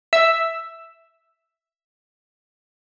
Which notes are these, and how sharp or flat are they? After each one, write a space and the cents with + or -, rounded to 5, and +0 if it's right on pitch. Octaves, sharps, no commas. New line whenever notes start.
E5 +0 E6 +0